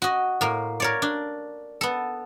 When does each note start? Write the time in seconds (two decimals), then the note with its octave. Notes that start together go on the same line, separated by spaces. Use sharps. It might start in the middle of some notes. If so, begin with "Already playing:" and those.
0.02 F#4 D#5
0.41 A2 A#3
0.80 A#4 C#5 D5
1.02 D4
1.81 B3 A4